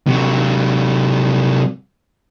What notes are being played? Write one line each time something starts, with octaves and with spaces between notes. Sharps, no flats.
C3 F#3